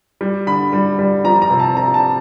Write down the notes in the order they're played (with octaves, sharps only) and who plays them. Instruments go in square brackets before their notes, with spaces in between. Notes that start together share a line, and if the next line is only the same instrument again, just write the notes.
[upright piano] G3
D3 B5
G3
G3
F3 A#5
A#5
C3
A5
C3 A#5
A5